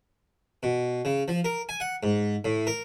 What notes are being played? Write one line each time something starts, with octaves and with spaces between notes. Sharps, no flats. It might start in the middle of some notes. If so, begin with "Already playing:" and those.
B2
C#3
F3
A#4
G#5
F#5
G#2
A2
A#4